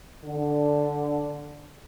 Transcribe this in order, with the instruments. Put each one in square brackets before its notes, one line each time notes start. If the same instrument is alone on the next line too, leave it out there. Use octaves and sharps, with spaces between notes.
[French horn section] D3